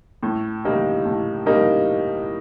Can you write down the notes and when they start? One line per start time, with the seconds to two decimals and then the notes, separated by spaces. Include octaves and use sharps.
0.23 A2
0.64 G3 A#3 D#4 A#4
1.05 A2
1.46 G3 A#3 D#4 A#4